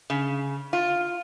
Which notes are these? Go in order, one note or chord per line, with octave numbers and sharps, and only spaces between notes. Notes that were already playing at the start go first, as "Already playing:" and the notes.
C#3
F4